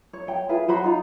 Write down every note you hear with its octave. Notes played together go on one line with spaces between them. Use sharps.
C#5
C#5 G5
E4 F4 G#4 B4
F#4 C5 B5
D#4 F4 A#5